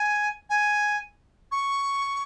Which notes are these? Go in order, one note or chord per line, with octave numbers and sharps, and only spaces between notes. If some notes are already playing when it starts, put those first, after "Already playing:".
Already playing: G#5
G#5
C#6